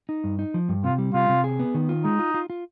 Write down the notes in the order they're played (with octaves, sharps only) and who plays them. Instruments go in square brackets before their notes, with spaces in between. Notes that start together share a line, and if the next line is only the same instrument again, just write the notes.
[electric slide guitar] D#4
G2
D#4
F3
G2
[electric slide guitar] C3 [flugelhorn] F4
[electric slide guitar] G3
[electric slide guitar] C3 [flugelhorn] F4
[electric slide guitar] C3
G#4
B3
D#3
F4
[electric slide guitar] G#3 [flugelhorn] D#4
[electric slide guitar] F4
F4
F4